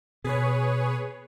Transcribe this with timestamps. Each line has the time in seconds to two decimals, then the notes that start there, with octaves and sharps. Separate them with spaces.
0.24 B2 G#4 B4 C#5